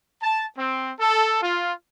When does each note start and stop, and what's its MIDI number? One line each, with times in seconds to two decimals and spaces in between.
0.22 0.46 81
0.58 0.92 60
1.00 1.38 69
1.42 1.72 65